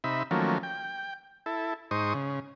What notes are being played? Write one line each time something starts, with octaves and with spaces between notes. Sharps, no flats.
C3 D#4 E5 B5
D#3 F3 F#3 A3 A#3 C#4
G5
E4 A4
G#2 D#4 C5 C#6 D#6
C#3